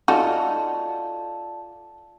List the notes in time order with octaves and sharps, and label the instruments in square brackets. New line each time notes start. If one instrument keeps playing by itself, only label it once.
[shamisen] D#4 F#4 [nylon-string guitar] F4 A4 [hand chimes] D5 A5